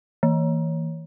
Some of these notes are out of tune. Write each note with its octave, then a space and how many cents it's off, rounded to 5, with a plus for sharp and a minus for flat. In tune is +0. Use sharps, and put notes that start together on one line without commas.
E3 -25